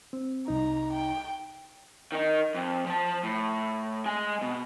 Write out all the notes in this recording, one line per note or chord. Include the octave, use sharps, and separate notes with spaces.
C4
C2 D#4 A#5
G5
D#3 D#4
F2
F3 A5
A2
G#3 G#5
B2